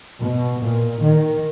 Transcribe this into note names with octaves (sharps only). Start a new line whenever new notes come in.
B2
A#2
D#3